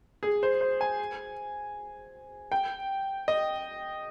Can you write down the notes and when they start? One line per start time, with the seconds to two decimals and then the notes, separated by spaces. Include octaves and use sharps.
0.23 G#4
0.43 C5
0.61 C5
0.81 G#5
2.52 G5
3.28 D#5